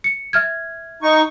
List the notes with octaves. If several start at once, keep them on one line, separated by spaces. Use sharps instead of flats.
C#7
E5 F6 G#6
D#4 C#6